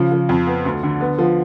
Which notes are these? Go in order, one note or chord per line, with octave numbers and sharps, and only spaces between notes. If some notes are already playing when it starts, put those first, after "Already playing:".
Already playing: C#3 F3
F3
F2
B3
D2
D3
B3
F3